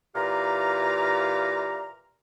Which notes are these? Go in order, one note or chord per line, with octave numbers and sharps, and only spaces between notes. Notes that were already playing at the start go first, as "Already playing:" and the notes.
A#2 E3 G4 F5 A#5